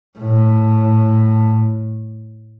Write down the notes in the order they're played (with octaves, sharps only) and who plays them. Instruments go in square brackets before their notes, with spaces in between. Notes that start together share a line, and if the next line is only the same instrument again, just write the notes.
[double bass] A2